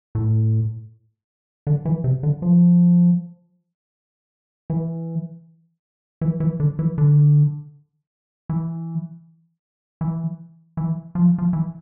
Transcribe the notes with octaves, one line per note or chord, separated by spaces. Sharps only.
A2
D3
E3
C3
D3
F3
E3
E3
E3
D3
E3
D3
E3
E3
E3
F3
F3
E3